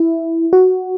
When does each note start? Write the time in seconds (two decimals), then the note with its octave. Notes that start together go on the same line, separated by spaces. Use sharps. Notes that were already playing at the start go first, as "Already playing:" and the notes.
Already playing: E4
0.53 F#4